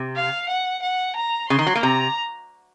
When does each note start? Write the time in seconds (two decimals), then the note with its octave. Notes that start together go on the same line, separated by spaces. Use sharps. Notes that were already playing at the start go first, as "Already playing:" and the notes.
Already playing: C3
0.16 F5
0.49 F#5
0.82 F#5
1.16 A#5
1.49 C#3 C6
1.59 D#3
1.67 F#3
1.75 A#3
1.83 C3 A#5